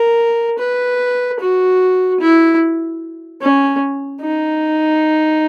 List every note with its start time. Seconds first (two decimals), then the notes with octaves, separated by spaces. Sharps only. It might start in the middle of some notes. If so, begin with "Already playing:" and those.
Already playing: A#4
0.58 B4
1.39 F#4
2.20 E4
3.42 C#4
4.21 D#4